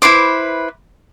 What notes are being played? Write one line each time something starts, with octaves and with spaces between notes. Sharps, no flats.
E4 B4 C5 D6